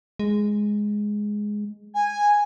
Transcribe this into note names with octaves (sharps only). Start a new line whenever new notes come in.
G#3
G#5